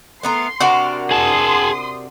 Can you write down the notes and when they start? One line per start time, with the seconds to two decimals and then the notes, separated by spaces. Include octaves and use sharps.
0.23 A3 B3 A#4 C6
0.60 C3 D4 F#4 A#4
1.11 G#4 A5 C6 D#6